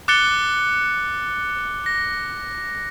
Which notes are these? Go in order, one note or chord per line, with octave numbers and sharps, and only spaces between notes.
D6 F#6 A6 C#7 G7
A#6